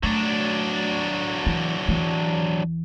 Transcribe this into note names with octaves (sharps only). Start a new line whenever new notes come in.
F#3 A3 D4
E3
E2 E3